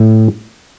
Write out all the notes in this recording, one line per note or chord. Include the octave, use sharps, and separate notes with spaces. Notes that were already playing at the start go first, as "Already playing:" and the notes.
Already playing: A2